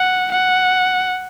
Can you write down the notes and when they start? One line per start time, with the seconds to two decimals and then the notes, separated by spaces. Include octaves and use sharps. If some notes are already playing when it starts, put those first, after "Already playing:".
Already playing: F#5
0.31 F#5